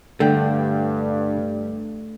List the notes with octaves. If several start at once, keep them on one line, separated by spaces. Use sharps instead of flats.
G2 D3 A3 G5